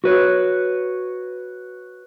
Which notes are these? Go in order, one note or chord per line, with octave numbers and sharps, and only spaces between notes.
F#4 B4 C#5